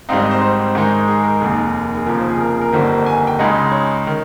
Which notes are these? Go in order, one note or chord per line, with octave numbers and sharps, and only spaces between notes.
G#1 G#2 G3 C4 D#4 F5
D#5
C5
C5
G#2 D#3 G#3 D#4
G#4
A#4
F1 D#2 D#3 G#4
G#4
F1 D#2 C#3 F3 A#4
C5
G#4
A#4
G#4
A#4
G1 F2 D#3 G3 A#3 C5
G#5
G5
C#2 C#3 G#3 D#4 D#5
C#5
D#3